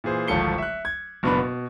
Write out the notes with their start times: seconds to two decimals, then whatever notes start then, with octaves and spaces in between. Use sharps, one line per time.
0.04 A#2 E3 G#4 C5
0.28 D1 G#1 F3 A4 C#7 G7
0.58 E5 F#6
0.85 G#6
1.23 F#1 B2 B3 D4 B5
1.37 B2